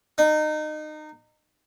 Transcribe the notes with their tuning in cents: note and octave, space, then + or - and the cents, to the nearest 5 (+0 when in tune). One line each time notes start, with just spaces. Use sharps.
D#4 -25